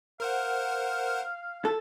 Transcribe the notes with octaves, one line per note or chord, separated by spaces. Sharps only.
A#4 C5 F5 F#5
A4